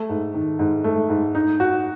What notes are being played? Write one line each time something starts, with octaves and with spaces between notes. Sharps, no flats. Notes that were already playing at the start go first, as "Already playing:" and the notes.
Already playing: A3
G#2
D#3
G#2
A3
G#2
D#4
F#4